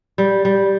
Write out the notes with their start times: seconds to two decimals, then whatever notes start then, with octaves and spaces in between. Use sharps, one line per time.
0.18 G3
0.45 G3